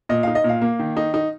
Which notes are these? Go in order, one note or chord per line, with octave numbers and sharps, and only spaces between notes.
A#2 D#5
D#4 F5
D#5
A#2 F5
A#3
D#3
D#4
D#4